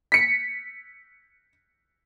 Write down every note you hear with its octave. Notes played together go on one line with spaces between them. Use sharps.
B6 C#7